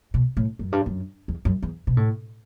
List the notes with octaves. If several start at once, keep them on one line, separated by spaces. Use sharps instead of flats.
B2
A2
F#2
G2
F#2
E2
F#2
E2
B2
A2